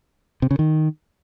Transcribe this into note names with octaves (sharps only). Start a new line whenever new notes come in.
C3
C#3
D#3